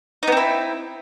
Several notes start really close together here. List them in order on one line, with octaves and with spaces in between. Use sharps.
D#4 B3 C4 E4